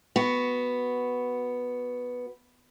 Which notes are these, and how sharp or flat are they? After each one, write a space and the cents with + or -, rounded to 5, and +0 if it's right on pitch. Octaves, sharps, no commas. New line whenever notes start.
B3 +0 F#4 +0